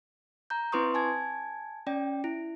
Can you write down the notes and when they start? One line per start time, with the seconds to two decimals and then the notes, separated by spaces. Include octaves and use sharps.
0.50 A#5 G6
0.72 C4 E4 B4 C6 C#6 D#6
0.94 G#5 A5 G#6
1.87 C#4 D5 G5
2.24 E4